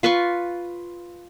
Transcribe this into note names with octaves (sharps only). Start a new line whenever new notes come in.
F4 B4 C6 C#6